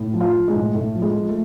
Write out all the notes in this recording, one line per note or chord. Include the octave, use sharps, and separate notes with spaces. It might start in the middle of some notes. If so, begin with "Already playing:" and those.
Already playing: A2
F3
F4 F5
F3
G#3 G#4
A2
A2 A3 A4
F3
G#3 G#4
F3
A3 A4